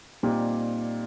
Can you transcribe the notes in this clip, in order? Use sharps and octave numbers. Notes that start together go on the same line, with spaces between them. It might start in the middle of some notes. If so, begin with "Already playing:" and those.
A#2 G3 C4 D#4 G4